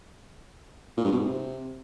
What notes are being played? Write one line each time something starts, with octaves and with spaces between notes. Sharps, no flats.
A#2
G2
B2
G#2
C3